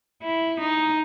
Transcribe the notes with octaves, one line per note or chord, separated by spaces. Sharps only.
E4
D#4